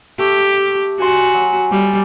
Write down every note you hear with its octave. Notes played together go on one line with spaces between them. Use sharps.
A3 G4
F#4 G#5 C6
F#3
G3 D5